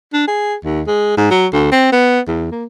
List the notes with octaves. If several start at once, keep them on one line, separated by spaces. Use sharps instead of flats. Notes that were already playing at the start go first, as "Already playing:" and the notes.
D4
G#4
D#2
G#3
G#2
F#3
D2
C4
B3
E2
A#3